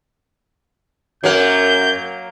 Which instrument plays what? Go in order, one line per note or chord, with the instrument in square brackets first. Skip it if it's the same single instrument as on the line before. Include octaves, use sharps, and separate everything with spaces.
[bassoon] F#2 [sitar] F#3 A#3 A#4 [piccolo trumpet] G6